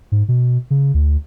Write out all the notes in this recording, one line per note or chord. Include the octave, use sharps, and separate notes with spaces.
G#2
B2
C#3
D2